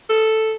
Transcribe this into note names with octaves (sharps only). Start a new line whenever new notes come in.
A4